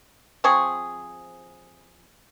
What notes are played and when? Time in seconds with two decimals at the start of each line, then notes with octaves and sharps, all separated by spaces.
0.44 F3 C4 G#4 C#6